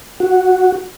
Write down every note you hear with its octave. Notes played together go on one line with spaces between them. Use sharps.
F#4